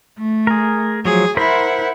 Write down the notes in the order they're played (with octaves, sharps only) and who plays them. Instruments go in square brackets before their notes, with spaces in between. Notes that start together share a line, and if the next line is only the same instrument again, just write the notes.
[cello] A3
[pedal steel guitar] G#4 A#4
[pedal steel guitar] F3 F#3 [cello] G#4
[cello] E4 F#5 [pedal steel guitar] A#4 C5 B5